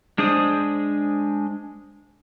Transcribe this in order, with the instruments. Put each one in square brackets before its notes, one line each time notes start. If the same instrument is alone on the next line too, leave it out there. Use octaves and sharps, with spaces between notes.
[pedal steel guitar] G#3 D4 G#4 C5 D#6